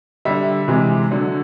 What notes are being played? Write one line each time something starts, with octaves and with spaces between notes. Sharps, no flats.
D3 G3 E5
C3 E3 G#3
D3 F#3